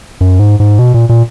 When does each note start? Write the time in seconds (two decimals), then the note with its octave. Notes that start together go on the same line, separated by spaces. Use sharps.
0.21 F#2
0.39 G#2
0.60 G#2
0.79 B2
0.94 A#2
1.09 A#2